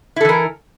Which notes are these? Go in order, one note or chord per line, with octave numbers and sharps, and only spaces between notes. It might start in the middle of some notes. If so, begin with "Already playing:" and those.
E3 E4 A4 A#4